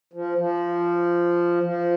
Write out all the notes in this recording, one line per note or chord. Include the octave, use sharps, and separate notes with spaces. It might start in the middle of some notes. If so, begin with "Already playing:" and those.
F3
F3
F3